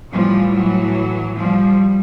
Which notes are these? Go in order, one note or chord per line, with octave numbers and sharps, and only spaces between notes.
A2 E3 F3 G3
F#3
F3 G3